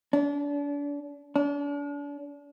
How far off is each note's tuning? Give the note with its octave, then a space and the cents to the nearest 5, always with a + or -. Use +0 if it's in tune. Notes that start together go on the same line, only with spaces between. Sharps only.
D4 -35
D4 -40